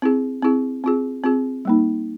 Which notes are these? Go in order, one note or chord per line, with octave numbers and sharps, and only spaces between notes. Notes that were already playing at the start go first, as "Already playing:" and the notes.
C4 E4 G#4
C4 E4 G#4
C4 F4 G#4
C4 F4 G#4
G3 A#3 D#4